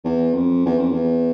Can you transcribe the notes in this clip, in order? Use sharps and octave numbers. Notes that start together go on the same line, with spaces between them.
E2
F2
E2
F2
E2